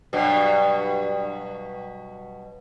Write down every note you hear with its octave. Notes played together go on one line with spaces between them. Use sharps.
G2 B2 F#3